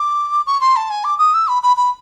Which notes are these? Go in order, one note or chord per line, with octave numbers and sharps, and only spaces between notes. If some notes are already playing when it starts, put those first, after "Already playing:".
Already playing: D6
C#6
C6
A5
G#5
D6
D#6
E6
B5
B5
B5